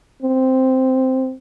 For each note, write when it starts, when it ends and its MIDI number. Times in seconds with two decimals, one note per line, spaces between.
0.22 1.34 60